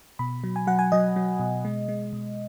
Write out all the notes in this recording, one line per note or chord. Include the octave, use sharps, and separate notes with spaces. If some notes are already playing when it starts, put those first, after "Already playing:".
B2 B5
F#3
G#5
F#3 F#5
G#5
F#3 D#5
F#3
B2
G#3
G#3
B2